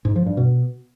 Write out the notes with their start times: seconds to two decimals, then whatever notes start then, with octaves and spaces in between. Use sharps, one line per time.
0.05 G#2
0.16 F3
0.26 G2
0.37 B2